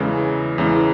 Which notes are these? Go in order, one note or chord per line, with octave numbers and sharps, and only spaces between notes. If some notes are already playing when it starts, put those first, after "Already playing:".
Already playing: E2 C#3 E3 G#3
E2 C#3 E3 G#3